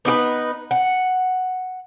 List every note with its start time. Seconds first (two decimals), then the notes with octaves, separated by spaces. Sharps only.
0.05 B3 D#4 G4 B4
0.71 F#5